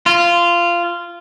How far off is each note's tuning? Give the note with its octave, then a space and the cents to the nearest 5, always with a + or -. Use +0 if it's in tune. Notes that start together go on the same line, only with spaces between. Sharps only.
F4 -15